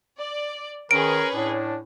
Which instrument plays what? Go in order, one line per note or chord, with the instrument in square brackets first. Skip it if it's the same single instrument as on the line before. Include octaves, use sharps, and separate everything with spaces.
[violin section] D5
[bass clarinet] D#3 [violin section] C#4 G#4 B4 [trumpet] A#4 [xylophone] D7
[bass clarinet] A2 [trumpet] D4